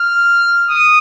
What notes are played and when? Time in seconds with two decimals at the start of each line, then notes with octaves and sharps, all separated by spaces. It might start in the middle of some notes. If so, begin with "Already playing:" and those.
Already playing: F6
0.69 D#6